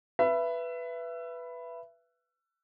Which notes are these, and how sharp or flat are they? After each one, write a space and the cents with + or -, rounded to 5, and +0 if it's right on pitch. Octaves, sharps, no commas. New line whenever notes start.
B4 +0 E5 +25